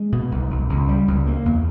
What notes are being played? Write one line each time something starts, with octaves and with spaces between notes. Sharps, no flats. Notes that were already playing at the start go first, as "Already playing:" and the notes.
Already playing: G#3
B2
C2
C2
C#2
G3
C#2
A#3
E2